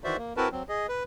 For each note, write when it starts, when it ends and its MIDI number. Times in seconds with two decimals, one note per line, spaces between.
0.04 0.17 51
0.04 0.17 52
0.04 0.17 66
0.04 0.17 72
0.04 0.17 74
0.04 0.17 76
0.17 0.33 58
0.37 0.49 60
0.37 0.49 64
0.37 0.49 66
0.37 0.49 70
0.37 0.49 71
0.37 0.49 81
0.52 0.63 54
0.52 0.63 60
0.69 0.87 68
0.69 0.87 75
0.89 1.03 71